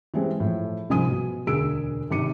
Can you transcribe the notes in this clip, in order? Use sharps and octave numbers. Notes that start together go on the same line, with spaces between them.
E3 G3 G#3 C4
A2 F3
C2 G#2 F3 G#5 D#6 D#7
B2
E1 D2 G#4 E6 D7
G#1 C3 D6 C#7 D#7